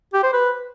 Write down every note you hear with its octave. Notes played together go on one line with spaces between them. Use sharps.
G4
C5
B4